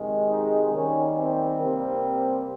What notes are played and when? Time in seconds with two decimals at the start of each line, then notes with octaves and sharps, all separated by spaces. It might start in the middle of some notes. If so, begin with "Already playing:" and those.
Already playing: C3 D#3 G#3
0.30 D#4
0.72 D#3 G3 A#3 C#4
1.16 C4
1.59 C3 G3 A#3